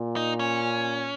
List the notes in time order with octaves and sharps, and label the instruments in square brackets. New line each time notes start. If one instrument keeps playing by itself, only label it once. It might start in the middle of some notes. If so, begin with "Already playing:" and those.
Already playing: [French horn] A#2
[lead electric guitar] D#4
C#4